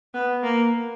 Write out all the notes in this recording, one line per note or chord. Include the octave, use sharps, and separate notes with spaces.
B3
A#3